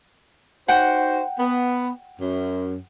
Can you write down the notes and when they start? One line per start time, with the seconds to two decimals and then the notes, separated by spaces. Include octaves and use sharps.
0.68 D#4 F#4 C5 F#5 G5
1.39 B3
2.20 F#2